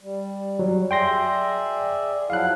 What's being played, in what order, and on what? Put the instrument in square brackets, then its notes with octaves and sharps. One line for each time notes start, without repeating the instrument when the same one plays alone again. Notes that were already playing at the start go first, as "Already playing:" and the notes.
[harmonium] G3
[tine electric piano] F#3
[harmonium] G#4 D5 E5 [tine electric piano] G5 C6 A#6
[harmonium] F3 F#3 E4 [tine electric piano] F5 F#6